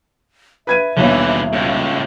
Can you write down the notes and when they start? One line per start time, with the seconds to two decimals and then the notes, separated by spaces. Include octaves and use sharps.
0.67 B4 E5 G#6 D#7
0.97 D#1 B1 D3 E3 C#5
1.53 C#2 A2